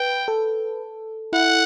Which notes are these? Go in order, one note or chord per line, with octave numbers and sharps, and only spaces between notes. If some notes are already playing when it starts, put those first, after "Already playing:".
Already playing: B4 G5
A4
E4 F#5